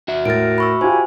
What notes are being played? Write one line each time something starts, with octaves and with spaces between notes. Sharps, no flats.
F#4 E5
A2 A#4 A6 D7
B5 C#6 E6
D#4 F4 G4 C5 G#5